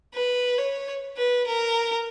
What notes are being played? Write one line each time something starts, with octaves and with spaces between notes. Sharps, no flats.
B4
C#5
B4
A#4